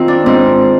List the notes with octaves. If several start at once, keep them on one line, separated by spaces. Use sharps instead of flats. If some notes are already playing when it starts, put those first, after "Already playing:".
Already playing: D#3 C4 F4
D4
G#2 C4